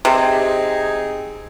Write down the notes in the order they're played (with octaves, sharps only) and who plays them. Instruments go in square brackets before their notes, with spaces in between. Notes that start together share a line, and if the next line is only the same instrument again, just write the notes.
[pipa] C3 [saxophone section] C4 D#4 G#4